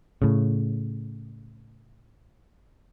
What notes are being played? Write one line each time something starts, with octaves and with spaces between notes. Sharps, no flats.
A2 C#3